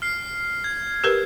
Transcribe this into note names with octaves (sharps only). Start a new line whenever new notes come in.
F6 C7
G#6
G4 A#4 B4